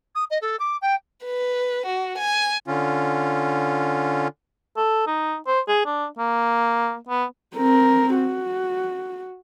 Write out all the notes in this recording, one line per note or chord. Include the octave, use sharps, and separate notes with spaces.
D#6
D#5
A4
D6
G5
B4
F#4
G#5
D3 C#4 F4
A4
D#4
C5
G#4
D4
A#3
B3
C4 A#4
F#4